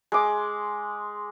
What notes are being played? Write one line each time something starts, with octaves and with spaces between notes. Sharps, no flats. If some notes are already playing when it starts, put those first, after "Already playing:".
G#3 D6